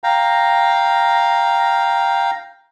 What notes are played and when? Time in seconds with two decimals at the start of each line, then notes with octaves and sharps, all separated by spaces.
0.04 F5 G5 A#5